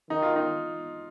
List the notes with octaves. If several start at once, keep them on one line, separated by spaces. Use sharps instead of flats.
D#3 D#4
F4
D#4